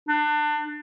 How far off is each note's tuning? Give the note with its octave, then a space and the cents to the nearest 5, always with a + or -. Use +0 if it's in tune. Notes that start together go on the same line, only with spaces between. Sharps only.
D4 +30